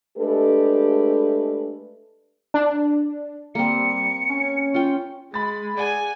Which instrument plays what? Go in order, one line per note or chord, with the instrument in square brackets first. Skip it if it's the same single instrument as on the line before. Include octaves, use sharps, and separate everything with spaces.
[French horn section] G#3 A3 D4 G4 A4 B4
[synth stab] D4
[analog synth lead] G3 [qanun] A#3 C4 [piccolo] C#7
[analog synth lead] C#4
[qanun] F4 G5
[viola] G#3 [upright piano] B5 A6
[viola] G#4 [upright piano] D5 F#5 [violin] G#5